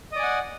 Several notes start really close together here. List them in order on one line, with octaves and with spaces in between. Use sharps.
D#5 D5 G#5 F#5